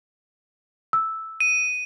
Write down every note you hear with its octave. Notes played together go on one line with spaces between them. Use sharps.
E6
D#7